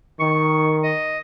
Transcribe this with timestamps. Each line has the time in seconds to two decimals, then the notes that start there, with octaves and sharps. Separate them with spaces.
0.20 D#3 C#6
0.83 D#5